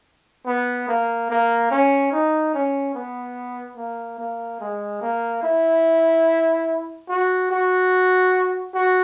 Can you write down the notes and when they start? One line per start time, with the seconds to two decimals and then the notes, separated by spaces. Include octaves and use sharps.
0.46 B3
0.88 A#3
1.30 A#3
1.71 C#4
2.12 D#4
2.54 C#4
2.94 B3
3.77 A#3
4.18 A#3
4.60 G#3
5.01 A#3
5.43 E4
7.09 F#4
7.51 F#4
8.74 F#4